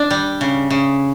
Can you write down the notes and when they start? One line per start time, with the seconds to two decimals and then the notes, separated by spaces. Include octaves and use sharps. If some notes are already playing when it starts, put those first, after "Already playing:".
Already playing: D4
0.11 G3
0.41 C#3
0.70 C#3